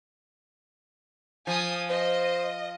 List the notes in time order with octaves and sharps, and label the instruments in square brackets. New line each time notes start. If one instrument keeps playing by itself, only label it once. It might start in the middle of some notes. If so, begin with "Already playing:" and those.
[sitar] F3 [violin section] G#5 D#6
[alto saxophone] C5 [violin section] D#5